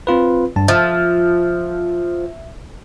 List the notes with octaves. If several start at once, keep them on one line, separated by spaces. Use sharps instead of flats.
C4 F4 B4
G2 A5
F3 E5